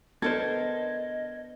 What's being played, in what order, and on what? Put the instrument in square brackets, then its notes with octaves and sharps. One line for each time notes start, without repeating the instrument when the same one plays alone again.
[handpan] B3 D4 [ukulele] A4 A#4 C5 [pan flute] D#5 [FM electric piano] G#6